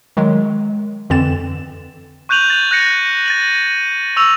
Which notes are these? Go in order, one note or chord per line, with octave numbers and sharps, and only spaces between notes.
D#3 F#3 G#3
F2 D3 E3 C4 A6 E7
C#6 F#6 G6 D#7 F7 F#7
A6 F7
F#6 A#6 C#7 D#7
A6 D#7 F#7
C#6 E6 F7